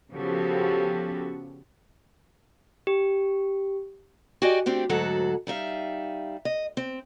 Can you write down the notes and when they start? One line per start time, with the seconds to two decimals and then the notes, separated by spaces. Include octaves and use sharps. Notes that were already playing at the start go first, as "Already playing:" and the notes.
0.13 C#3 F3 B3 F#4 G4 A4
2.87 G4
4.42 F#4 G4 D5 D#5 G#5
4.66 A3 C4 D4 G4
4.89 D2 G#2 F#3 F#4 A4 F#5
5.47 G3 D#4 E5 F5
6.45 D#5
6.77 C4